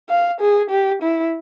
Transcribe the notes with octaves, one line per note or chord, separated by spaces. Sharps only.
F5
G#4
G4
E4